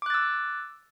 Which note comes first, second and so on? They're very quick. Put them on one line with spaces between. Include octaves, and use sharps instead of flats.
D6 F#6 A6 E6